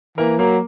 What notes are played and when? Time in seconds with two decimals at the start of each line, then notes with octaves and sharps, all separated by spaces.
0.18 E3 A#3 A#4
0.39 F#3 A#3 A#4